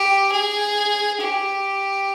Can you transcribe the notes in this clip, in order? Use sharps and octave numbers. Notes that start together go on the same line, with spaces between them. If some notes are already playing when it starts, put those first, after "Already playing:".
Already playing: G4
G#4
G4